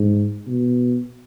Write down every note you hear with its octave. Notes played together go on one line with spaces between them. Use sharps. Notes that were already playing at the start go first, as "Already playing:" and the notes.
Already playing: G#2
B2